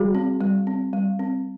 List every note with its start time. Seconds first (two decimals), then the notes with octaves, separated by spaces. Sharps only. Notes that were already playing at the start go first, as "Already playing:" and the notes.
Already playing: G3 F#4 G#4
0.15 C4
0.41 G3
0.67 C4
0.93 G3
1.19 C4